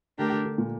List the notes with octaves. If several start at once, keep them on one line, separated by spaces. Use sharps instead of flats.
D3 A3 D4 G4 A#4
D3
D3
A#2